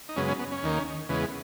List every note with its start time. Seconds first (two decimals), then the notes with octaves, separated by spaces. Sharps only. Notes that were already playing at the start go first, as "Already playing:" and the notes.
0.09 D#4
0.16 F#2 C#3 G#3 B3 C#4
0.28 C#4
0.39 B3
0.52 C#4
0.63 D#2 D#3 A#3
1.09 E2 C#3 G#3 B3